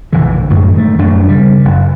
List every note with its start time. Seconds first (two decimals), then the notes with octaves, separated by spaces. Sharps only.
0.13 F1 A#1 D3 E3
0.50 F#2 A2 D#3 G#3
0.76 D#3 A3
0.98 D#1 F#2 A#2 D4
1.29 C#3 G3
1.64 F#1 F2